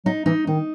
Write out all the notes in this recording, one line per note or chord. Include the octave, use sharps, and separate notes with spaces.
F#3 D#4
E3 D#4
D#3 D#4